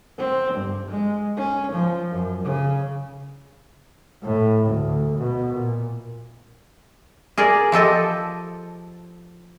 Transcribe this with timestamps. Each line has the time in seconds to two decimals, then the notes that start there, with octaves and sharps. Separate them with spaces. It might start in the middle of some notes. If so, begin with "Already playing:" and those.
0.18 C4
0.53 G2
0.89 G#3
1.37 C#4
1.71 F3
2.11 F#2
2.43 C#3
4.24 A2
4.67 D2
5.18 B2
5.53 A#2
7.38 G#4 A#4 D5
7.72 F3 G4 A4 D#5